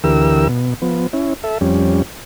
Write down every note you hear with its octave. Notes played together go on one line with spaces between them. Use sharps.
D2 E3 G4 A#4 E6
B2
F3 B3
C#4 E4
A4 E5
F2 G3 C#4